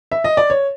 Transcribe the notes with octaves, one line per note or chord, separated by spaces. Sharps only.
E5
D#5
D5
C#5